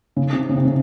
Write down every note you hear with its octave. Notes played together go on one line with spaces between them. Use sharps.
C#3
C3
C#3
C3
C#3